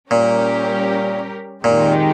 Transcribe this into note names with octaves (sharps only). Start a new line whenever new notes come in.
A#2 G3 C#4 G4 A#4
F2 A#2 D#3 G#3 D#4 G4